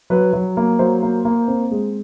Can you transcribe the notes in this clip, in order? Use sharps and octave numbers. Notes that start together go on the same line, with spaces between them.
F#3 B4
F#3
A#3
F#3 C5
A#3
A#3
C4
G#3